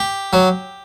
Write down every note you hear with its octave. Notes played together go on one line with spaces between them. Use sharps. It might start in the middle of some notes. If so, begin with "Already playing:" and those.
Already playing: G4
F#3